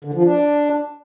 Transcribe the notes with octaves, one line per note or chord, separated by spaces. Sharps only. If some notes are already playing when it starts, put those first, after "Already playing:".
D3
F3
D4